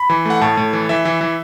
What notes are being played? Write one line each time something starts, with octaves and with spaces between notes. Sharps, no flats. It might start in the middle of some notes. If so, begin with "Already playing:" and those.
Already playing: B5
E3
A3 F#5
A2 A5
A2
E3
E3 E5
E3
E3